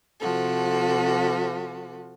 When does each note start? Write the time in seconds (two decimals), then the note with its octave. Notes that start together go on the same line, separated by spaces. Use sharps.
0.19 C3 F3 F#4 A4